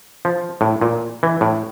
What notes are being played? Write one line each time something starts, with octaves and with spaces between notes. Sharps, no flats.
F3
A2
A#2
E3
A2